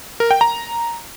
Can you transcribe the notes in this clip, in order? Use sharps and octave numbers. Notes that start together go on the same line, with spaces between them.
A#4
G5
A#5